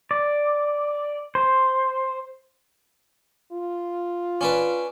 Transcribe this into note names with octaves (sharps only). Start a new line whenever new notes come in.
D5
C5
F4
C#4 D4 B4